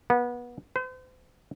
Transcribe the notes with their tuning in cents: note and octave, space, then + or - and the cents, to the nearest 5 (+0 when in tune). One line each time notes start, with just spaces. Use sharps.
B3 -25
C5 -40